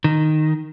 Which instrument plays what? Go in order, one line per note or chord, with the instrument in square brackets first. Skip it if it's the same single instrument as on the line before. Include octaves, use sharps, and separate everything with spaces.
[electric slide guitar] D#3